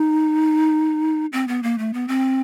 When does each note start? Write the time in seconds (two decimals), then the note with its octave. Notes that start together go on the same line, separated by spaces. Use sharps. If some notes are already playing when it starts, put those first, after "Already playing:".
Already playing: D#4
1.33 C4
1.48 B3
1.63 A#3
1.78 A3
1.94 B3
2.08 C4